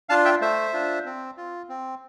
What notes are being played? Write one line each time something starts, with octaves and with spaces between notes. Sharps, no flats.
D4 F4 F5 A5
E5 G5
A3 C5 E5
D4 F4
C4
F4
C4